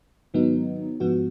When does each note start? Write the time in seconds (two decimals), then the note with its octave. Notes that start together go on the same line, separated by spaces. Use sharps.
0.34 G#2 D#3 F#3 B3 D#4
1.00 G#2 F3 B3 F#4